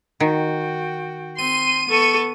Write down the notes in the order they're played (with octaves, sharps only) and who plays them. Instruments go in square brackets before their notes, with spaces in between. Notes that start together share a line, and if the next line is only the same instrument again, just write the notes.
[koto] D#3 [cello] F#4 G5
[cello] C4 [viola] C6 [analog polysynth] D#7
[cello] B3 [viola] A4 C#6